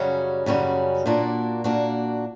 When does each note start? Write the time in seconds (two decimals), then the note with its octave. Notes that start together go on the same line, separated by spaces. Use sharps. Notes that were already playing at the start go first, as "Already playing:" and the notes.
Already playing: F#2 C#3 G3 C#4 F#4
0.46 F#2 C#3 G3 C#4 F#4
1.06 A#2 A#3 D4 F#4
1.64 A#2 A#3 D4 F#4